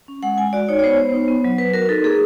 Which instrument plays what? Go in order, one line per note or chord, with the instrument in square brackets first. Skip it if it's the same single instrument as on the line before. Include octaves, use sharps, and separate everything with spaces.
[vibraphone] C#4
G#3 F#5
G#3 G#5
F#4 D5
D#4 C#5
C#5
B3 C5
B3
D#4
B3
F#3
F#3 B4
F#4 A#4
D#4 A4
A#3 G#4